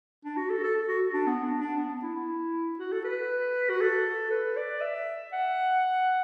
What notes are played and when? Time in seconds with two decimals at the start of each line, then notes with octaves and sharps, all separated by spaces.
0.25 D4
0.37 F#4
0.50 A4
0.64 A4
0.88 F#4
1.14 D4
1.27 B3
1.43 D4
1.60 D4
1.77 B3
1.90 D4
2.02 E4
2.15 E4
2.79 F#4
2.92 A4
3.04 B4
3.70 F#4
3.81 A4
4.31 B4
4.57 D5
4.81 E5
5.33 F#5